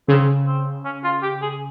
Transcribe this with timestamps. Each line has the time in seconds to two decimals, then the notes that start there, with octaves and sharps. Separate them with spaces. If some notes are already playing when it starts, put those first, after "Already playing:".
0.08 C#3 C4
0.46 C4
0.85 C#4
1.04 F4
1.23 G4
1.42 G#4